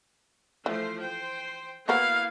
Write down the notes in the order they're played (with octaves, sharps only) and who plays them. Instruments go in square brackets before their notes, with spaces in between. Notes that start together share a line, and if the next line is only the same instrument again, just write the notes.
[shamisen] E3 [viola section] F3 A3 C5
[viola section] C5 G5
[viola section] A#3 B3 E4 [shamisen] F#4 A#4 B4 [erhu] F5